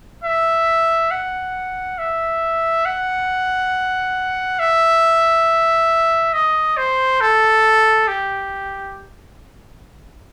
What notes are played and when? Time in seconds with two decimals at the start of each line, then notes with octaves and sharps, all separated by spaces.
0.24 E5
1.11 F#5
1.98 E5
2.85 F#5
4.59 E5
6.33 D#5
6.77 C5
7.21 A4
8.08 G4